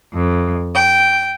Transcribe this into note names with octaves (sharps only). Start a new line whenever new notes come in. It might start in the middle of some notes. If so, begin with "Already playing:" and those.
F2
G5